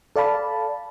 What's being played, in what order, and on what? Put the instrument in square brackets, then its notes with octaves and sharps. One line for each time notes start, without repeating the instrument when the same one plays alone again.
[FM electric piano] A4 D5 F5 A5 B5